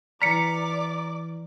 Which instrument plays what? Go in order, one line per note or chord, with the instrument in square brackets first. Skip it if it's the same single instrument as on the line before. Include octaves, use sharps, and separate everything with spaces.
[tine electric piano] E3 F6 [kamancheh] D5 D6 [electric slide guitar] A#5 [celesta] B6 C#7